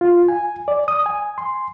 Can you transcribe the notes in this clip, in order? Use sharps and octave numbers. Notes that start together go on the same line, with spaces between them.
F4
G#5
D5
D#6
G#5
C6